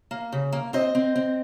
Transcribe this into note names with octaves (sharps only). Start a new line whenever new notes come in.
A#3
C#3
A#3
C4 C5 D#5
C4
C4